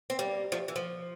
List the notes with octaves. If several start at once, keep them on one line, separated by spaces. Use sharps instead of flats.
C4
G3 A#3
F3 A3
E3
F3